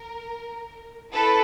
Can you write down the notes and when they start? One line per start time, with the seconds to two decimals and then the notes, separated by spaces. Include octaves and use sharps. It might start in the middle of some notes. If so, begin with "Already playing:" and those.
Already playing: A#4
1.12 C#4 E4 A4 B4